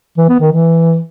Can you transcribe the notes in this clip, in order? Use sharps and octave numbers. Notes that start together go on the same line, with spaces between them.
E3
B3
D#3
E3